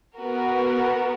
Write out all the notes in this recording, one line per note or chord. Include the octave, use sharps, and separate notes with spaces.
B3 F#4 A#4